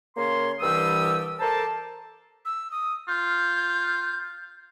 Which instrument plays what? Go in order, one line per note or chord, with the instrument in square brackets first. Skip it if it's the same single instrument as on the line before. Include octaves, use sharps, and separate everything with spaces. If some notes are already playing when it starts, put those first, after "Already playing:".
[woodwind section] C#3 A#3 C#5 C6
C2 G2 E3 G3 D#6 E6
A4 A#4 C5 D5 A5
[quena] E6
D#6
[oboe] F4 [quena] G6